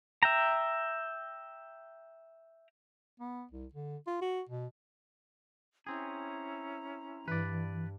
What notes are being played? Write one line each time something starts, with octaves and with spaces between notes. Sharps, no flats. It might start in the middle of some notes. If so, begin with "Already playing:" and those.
E5 G5 A#5
B3
C2
D3
F4
F#4
B2
C4 C#4 E4 G#4 A#5
G2 E3 B4 D5